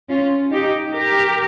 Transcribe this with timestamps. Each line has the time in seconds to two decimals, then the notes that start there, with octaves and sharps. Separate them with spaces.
0.09 C#4 F4
0.52 D#4 G4
0.94 G4 A#4